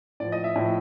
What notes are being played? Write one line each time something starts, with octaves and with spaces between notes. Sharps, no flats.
A2 F3 D5
D#5
E5
A2 F3